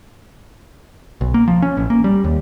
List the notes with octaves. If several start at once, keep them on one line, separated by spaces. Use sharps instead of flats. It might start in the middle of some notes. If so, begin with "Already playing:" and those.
B1
A#3
F3
C#4
A1
A#3
G3
D#2